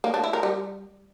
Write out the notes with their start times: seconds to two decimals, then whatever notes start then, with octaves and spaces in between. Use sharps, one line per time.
0.04 A#3
0.14 D4
0.24 E4
0.33 A#4
0.43 G3